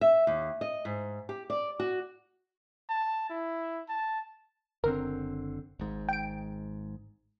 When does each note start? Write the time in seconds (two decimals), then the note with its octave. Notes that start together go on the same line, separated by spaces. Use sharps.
0.01 E5
0.27 D#2
0.61 D#5
0.85 G#2
1.29 G4
1.50 D5
1.80 F#4
2.89 A5
3.30 E4
3.89 A5
4.84 F#1 D3 C4 A#4
5.79 G#1 G#2
6.09 G5 D7